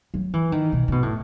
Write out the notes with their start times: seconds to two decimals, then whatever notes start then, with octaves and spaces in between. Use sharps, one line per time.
0.14 F#3
0.33 E3
0.52 D#3
0.72 B2
0.88 C#3
0.92 B2
1.03 A2